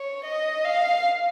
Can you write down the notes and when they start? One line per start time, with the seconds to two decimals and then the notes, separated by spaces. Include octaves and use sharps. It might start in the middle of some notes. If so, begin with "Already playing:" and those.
Already playing: C#5
0.24 D#5
0.64 F5